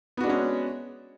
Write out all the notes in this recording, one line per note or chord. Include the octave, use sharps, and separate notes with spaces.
G#3 B3 C#4 D4 F#4